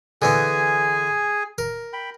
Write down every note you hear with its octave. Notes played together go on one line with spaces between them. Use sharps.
D3 E3 B3 G#4 G#5
A#4
G5 B5